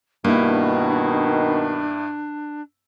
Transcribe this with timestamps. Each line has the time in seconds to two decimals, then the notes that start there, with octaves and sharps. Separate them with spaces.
0.24 G2 B2 D#3 A#3 D4 E4